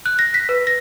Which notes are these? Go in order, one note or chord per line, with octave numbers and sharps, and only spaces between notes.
F#6
A#6
B6
B4
A#6